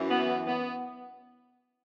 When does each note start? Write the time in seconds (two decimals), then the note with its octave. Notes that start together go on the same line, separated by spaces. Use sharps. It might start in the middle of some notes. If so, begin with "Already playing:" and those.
Already playing: F#2 E3
0.10 B3
0.47 B3